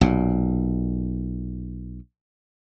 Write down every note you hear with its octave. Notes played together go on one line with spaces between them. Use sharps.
B1 A#2